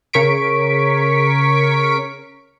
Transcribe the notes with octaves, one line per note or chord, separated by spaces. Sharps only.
C#3 A#4 C#5 C#6 B6 D7